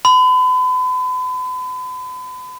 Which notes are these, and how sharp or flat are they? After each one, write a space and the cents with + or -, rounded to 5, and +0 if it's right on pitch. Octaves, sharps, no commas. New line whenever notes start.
B5 +40